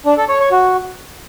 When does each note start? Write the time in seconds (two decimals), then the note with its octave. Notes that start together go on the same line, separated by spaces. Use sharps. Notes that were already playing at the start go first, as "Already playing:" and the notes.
0.06 D4
0.17 A4
0.29 C#5
0.40 C#5
0.52 F#4